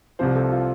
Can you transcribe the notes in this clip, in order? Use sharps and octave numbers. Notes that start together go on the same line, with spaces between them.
C2 C3 F3 C5
A4
F4